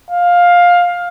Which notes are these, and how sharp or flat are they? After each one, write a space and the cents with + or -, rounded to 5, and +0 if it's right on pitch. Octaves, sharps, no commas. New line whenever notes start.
F5 +15